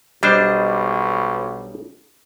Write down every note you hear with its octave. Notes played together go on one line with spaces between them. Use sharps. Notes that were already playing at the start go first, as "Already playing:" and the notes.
B1 G3 D4 C5 D#5